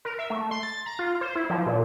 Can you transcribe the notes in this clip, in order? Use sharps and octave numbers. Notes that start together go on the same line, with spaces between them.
A#4
E5
A3
C6
A6
A#5
F4
C5
E4
F3
A#2